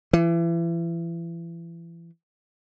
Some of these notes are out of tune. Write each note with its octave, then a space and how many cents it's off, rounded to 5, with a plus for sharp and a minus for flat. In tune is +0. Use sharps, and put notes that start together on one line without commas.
E3 +35